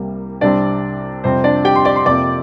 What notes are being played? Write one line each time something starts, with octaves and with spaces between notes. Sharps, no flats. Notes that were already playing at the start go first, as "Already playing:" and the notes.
Already playing: C2 C3 G3 A#3
C2 C3 G3 C4 D4 D5
F2 C3 G3 C4 C5
D4 D5
G4 G5
C6
D5 D6
C6
F2 C3 A#3 D5 D6